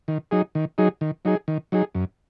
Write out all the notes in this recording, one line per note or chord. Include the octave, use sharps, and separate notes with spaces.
D#3
F#3 D#4 G#4
D#3
F#3 D#4 G#4
D#3
F#3 D#4 G#4
D#3
F#3 D#4 G#4
F#2